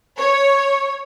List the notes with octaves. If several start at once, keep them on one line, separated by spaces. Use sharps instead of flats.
C#5